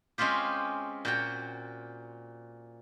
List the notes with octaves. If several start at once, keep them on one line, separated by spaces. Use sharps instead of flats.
G#3 C4 C#4 F4 G4
A#2 F#4 G5